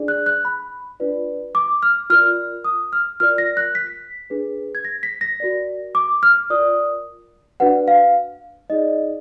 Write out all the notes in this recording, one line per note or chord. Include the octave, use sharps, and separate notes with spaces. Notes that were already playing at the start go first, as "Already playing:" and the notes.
Already playing: D4 G#4 D5
F#6
F#6
B5
D4 F4 B4 D5
D6
F6
F4 A#4 D5 F6
D#6
F6
F4 A#4 D5 F6
A#6
F#6
B6
D4 G#4 B4
G#6
A#6
B6
A#6
F#4 A#4 D5
D6
F6
F4 A#4 D5 D#6
D4 F#4 B4 D5 F#5
F5
D#4 G#4 D5 D#5